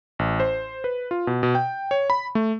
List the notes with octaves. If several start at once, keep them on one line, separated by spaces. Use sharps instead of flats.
A1
C5
B4
F4
B2
B2
G5
C#5
B5
A3